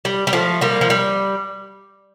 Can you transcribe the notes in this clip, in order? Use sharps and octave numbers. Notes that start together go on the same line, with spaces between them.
G3
G3
F3 A3
G3 A#3
F3
G3